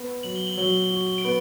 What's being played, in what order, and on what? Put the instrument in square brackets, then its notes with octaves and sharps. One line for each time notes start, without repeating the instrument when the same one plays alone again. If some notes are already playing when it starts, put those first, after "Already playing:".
Already playing: [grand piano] B3
[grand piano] F#3 [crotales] F#7
[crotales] G7
F#7
[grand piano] F#3 [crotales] G7
[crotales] F#7
G7
[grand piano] F#4 [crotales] F#7
[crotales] G7
D7 F#7
[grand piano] B3